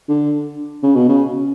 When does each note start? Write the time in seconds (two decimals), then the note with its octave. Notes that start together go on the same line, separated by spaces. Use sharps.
0.09 D3
0.83 C#3
0.95 B2
1.09 C#3